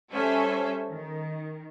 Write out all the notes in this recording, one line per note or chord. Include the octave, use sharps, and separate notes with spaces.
G3 C#4 A4 C5 E5
D#3